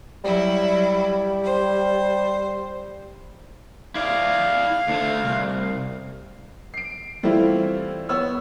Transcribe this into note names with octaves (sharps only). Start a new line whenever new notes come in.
F#3 G3 E4
C5
E4 D5 F5
D2 A3
C2
C7 D7
E3 G3 A3 C4 E4 F4
B3 C#5 E6